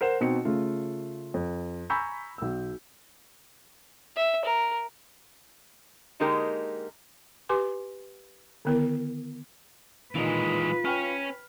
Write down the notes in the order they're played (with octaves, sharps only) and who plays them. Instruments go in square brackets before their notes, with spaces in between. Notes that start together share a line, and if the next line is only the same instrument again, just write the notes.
[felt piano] A#4 C5 F#5 E7
B2 C4 D#4 C#7
C#3 A3 F4
F2
G#5 A#5 B5 C#6 E6 G6
B1 E6
[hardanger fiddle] E5
A#4
[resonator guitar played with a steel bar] D3 G#3 A#3 D#4 G4 A#4
[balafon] G4 B4 G#5 C6 D6
D3 D#3 B3 E4 A#4
[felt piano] A#2 D#3 D#4 [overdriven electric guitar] E3 G#3 [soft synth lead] F4 [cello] B4
[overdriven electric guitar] C#4 [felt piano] G5 F6